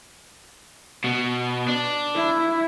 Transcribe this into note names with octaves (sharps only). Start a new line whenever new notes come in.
B2
D4
E4